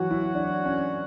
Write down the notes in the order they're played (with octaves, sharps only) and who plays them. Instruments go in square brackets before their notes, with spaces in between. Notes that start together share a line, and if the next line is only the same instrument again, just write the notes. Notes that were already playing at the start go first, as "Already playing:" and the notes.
Already playing: [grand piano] E3 F#3 [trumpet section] F#4 C#5 F#5
[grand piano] E4
D4
C#4